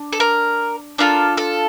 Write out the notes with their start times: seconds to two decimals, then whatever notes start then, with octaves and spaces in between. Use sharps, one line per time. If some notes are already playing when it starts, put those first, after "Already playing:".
Already playing: D4
0.13 A4
0.20 A#4
0.98 D4 F4 A4 A#4
1.37 A4